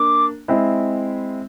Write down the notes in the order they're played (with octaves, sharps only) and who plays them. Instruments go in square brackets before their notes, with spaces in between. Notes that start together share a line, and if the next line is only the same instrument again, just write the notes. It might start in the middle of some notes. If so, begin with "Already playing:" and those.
Already playing: [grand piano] A#3 D4 [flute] D6
[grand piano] G#3 C4 E4